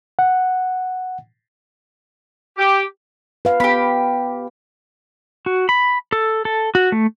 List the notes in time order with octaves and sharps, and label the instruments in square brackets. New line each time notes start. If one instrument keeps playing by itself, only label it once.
[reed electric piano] F#5
[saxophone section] G4
[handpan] B4 F5
[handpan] B3 [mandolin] G4 B5
[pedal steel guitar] F#4
B5
A4
A4
F#4
A3